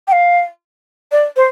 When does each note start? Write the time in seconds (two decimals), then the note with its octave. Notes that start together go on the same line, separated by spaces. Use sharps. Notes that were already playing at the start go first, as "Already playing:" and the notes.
0.08 G5
0.12 F5
1.12 D5
1.36 C5